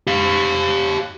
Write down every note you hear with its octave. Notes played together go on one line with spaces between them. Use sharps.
G4 F5